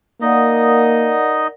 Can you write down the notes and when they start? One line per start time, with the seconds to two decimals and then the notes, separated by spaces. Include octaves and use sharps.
0.21 A#3 D#4 A#4 D5 D#5 F#5